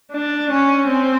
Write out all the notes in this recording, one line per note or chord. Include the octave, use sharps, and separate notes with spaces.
D4
C#4
C4